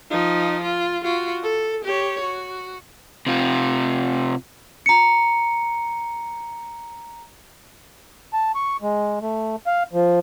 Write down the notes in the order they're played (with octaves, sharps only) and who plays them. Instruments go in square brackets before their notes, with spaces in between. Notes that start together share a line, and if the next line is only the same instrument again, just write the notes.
[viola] F3 D#4
F4
F4 F#4
A4
G4 C#5
F#4
[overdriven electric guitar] C3 F4
[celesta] A#5 C#7
[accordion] A5
C#6
G#3
A3
F5
F3